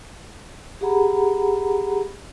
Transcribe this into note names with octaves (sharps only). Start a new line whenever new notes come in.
G4 G#4 F#5 A#5 B5